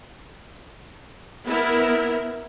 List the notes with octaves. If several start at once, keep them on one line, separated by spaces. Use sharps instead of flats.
B3 E4 A#4